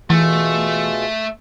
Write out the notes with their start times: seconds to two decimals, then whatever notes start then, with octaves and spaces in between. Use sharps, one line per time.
0.10 B2 E3 A3 F4 G#4